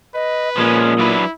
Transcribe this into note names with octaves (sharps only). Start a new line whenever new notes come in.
B4 D#5
A#2 F3 G#3 C#4 D#6
F#3 D4 E4 B4